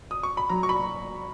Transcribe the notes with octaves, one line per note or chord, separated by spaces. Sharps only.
D#6
C#6
B5
F#3 A#5
C#6
B5